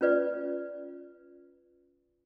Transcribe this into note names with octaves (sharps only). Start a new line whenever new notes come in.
C#4 F4 B4 D5